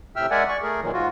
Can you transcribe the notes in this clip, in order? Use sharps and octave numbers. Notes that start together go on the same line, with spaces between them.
A2 C3 E5 G5 E6 F6
G#3 A#4 D5 E5 F#5 G#5
D5 C#6
A3 G#4 A#4
A#2 D#3 E3 F#3
G#2 F4 F#4